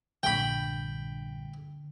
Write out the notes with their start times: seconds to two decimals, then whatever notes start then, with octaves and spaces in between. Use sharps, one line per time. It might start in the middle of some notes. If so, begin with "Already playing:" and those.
0.23 A#1 G2 D3 G5 B5